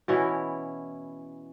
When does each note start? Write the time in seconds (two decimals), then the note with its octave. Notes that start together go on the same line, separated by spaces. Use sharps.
0.08 B2 E3 C#4 E4